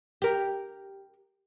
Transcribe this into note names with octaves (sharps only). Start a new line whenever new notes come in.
G4 A#4